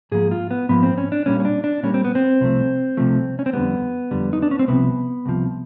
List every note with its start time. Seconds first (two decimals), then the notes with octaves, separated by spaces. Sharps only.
0.12 G#2 F3 A#3 G#4
0.31 F4
0.51 B3
0.69 G#2 F3 A#3 B3
0.83 C4
0.98 C#4
1.12 D4
1.26 A#2 G3 A#3 C#4
1.40 C#4
1.45 D4
1.64 D4
1.83 A#2 G3 A#3 C#4
1.94 C4
2.05 B3
2.15 C4
2.41 C2 C3 F3 A3
2.97 C2 C3 F3 A3
3.39 C#4
3.46 C4
3.53 F2 D3 G3 B3
4.11 F2 D3 G3
4.33 D#4
4.42 D4
4.51 C#4
4.59 C4
4.68 C2 C3 F3 B3
5.26 C2 C3 F3